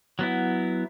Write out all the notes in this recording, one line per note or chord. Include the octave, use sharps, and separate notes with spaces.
F#3 B3 E4